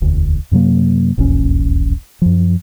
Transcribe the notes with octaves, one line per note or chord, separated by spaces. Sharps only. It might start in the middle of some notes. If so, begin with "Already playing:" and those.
E1 D2
F#2 C3 F#3 A#3
D#1 A#1 E2 C#4
F#2 F3